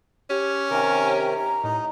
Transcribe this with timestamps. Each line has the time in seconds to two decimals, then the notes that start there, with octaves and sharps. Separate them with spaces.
0.30 C#4 G4
0.70 C3 D#3 A#4 G#5
1.34 A#5
1.63 A2 D#4